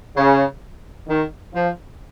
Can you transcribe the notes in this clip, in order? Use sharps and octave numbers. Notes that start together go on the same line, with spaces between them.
C#3
D#3
F3